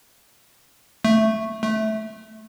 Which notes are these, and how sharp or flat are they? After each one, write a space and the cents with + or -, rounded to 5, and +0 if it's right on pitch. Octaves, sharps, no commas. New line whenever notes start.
A3 +5
A3 -15